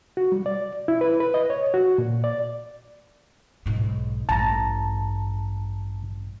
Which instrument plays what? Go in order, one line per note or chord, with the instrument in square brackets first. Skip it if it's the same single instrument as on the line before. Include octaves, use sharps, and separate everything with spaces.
[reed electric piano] F#4
G3
D5
E4
B4
B4
D#5
C#5
F#4
A#2
D5
[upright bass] B1 G#2
[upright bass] A1 G2 [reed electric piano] A5 A#5